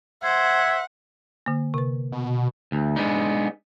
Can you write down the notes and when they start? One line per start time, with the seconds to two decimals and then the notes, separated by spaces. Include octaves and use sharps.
0.23 C5 E5 F#5 G#6
1.46 D3 A#3
1.74 C3 B4
2.12 B2
2.72 D2
2.96 G#3 B3 D4 D#4